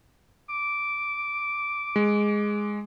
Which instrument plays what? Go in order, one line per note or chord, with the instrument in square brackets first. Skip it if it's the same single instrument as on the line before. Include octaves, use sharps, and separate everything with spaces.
[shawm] D6
[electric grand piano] G#3